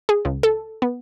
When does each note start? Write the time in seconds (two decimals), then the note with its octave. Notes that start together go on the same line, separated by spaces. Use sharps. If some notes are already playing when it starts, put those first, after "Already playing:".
0.09 G#4
0.25 C#2
0.43 A4
0.82 B3